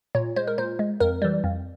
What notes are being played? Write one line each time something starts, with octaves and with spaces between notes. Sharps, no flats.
A#2 C#5
G#3 C5
A#4
A#2 C5
G#3
F2 A#4
E3 G3
F2